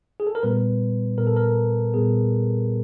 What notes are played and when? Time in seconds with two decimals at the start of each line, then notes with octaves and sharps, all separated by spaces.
0.20 G#4
0.27 A4
0.35 A#4
0.43 A#2 G3 B3 B4
1.18 A#2 G3 B3 A#4
1.27 A4
1.36 A#4
1.94 A#2 G3 B3 G#4